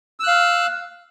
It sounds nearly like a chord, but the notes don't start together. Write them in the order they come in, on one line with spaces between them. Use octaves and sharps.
E6 F#6 F5